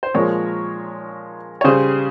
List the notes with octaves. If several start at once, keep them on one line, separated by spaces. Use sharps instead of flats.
C5
A#2 F3 G#3 A#4 C#5
C#5
C#3 G3 G#4 C5